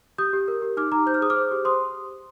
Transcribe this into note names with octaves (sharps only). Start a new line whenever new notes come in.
G4 D#6 G6
G4
A#4
G4
D#4 D6 F6
D#4 A#5 D6
C5 G6
F6
G#4 D#6
D6 F6
C5
G4
C5 C6 D#6